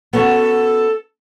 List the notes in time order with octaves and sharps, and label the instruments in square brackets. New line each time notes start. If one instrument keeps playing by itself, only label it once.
[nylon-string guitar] B3 C#4 F#4 [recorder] A4